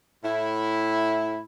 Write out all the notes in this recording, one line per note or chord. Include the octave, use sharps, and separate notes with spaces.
A2 E4